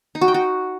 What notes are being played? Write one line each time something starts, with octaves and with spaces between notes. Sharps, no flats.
D#4
F#4
G5
F#4